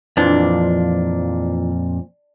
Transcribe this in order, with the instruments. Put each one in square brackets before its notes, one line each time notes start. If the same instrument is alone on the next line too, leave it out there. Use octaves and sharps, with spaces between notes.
[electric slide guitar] F2 A#2 [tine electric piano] E3 F3 F4 [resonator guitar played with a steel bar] D4